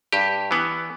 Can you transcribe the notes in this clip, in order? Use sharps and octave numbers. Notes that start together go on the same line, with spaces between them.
G2 G4
E3 B3